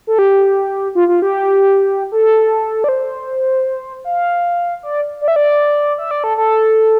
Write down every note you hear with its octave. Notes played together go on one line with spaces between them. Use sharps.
A4
G4
F4
F4
G4
A4
D5
C5
F5
D5
D5
E5
D5
E5
D5
A4
A4